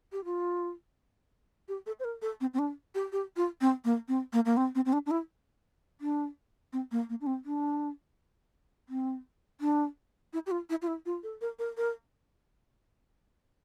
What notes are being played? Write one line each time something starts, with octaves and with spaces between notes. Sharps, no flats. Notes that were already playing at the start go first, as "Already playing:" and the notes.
G4
F4
G4
A4
C5
A#4
A4
C4
C4
D4
G4
G4
F4
C4
A#3
C4
A#3
A#3
C4
C4
C4
D4
D4
E4
D4
C4
A#3
A#3
D4
C4
D4
C4
D4
E4
G4
F4
E4
F4
E4
F4
A4
A#4
A#4
A#4